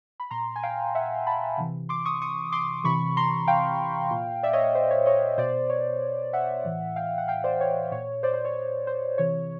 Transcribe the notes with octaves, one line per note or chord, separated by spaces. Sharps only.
B5
A#2 A#5 C6
G#5
F5 G5
E5 F#5
A5 B5
C3 E3
C6 D6
C#6 D#6
C#6 D#6
C6 D6
C3 E3 B5 C#6
A#5 C6
F5 G5
A#2
D5 E5
C#5 D#5
C#5
C5
C#5
C#5 D#5
B2 C5 D5
C#5
E5 F#5
A2 E3
F5 G5
F#5
F5 G5
C5 D5
C#5
A#2 C#5
C5 D5
C5 D5
C#5
C5
C3 E3 C#5